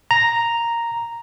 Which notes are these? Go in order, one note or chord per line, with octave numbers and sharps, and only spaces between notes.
A#5